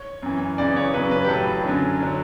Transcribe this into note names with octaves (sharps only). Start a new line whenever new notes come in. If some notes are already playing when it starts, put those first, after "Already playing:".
Already playing: C#5
F#2 E3
E2 C#3 E3 D5
C#5
F#2 C#3 F#3 B4
B4
G4
A2 F#3 A4
F#2 D3 F#3
D3 F#3